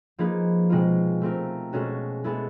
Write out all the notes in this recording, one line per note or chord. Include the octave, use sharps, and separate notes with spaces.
F3 A#3 D#4 G#4 B4
B2 G#3 C4 F4
A3 C4 F4 A#4
B2 G#3 C#4 F#4 A4
G#3 B3 E4 A4